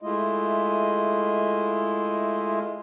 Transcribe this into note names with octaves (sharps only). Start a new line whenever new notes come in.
G#3 A3 E4 F4 D#5